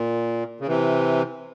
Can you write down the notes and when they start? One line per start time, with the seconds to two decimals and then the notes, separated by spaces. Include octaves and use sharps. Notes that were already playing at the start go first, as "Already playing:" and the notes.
Already playing: A#2
0.60 C#3
0.67 C3 E3